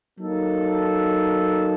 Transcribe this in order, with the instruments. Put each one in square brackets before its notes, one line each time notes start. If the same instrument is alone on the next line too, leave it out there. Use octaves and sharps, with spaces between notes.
[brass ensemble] F#3 A#3 D#4 A4